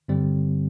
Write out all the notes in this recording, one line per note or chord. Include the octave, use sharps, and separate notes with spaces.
G2 D3 G3 C4